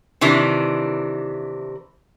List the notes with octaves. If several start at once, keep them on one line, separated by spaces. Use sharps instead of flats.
C3 D#3 E3 D4